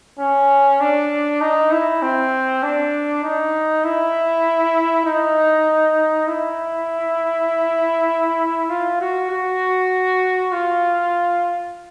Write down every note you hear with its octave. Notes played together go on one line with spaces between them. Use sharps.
C#4
D4
D#4
E4
C4
D4
D#4
E4
D#4
E4
F4
F#4
F#4
F4